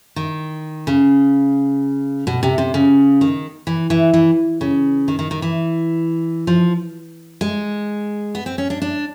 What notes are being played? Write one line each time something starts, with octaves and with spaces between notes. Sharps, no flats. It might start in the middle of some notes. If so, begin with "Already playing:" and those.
D#3
C#3
B2
C3
C3
C#3
D#3
E3
E3
E3
C#3
D#3
D#3
D#3
E3
F3
G#3
B3
C4
C#4
D4
D4